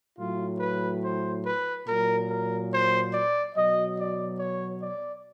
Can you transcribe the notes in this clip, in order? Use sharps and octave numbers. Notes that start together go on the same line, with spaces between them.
A2 F#3 F4
B4
C5
B4
A#2 F#3 A#4
A#4
C5
D5
B2 F#3 D#5
D5
C#5
D5